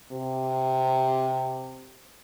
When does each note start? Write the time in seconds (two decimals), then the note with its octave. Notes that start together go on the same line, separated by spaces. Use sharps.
0.12 C3